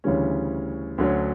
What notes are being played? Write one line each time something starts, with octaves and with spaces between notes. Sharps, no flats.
D2 C#3 E3 G3 C#4
D2 D3 F#3 C#4